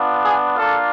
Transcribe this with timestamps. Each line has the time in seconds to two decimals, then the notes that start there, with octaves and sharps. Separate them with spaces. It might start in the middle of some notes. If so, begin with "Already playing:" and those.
Already playing: B3 D4 F4
0.24 G#4
0.57 A#3 D4 F4 A4